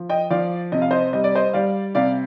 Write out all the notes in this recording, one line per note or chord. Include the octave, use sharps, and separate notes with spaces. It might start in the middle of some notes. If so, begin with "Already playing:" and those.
Already playing: F3
D#5 G5
F3 D5 F5
C3 D#5
F5
C5 D#5
G3 D#5
D5
C5 D#5
G3 D5 F5
C3 D5 F5